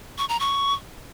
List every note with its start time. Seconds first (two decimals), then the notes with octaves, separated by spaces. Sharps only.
0.18 C#6
0.29 A#5
0.40 C#6